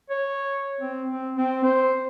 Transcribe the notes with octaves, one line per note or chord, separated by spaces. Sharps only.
C#5
C4
C4
C4
C5